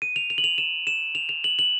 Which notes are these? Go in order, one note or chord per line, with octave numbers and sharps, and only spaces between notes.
D#7
F7
F7
F#7
F7
E7
E7
F7
F7
F#7
F#7